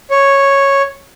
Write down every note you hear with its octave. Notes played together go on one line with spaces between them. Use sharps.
C#5